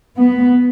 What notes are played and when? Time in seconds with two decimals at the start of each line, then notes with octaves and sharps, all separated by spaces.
0.16 B3